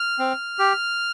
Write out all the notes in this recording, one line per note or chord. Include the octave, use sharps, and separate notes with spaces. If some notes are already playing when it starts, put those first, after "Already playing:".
Already playing: F6
C4
G4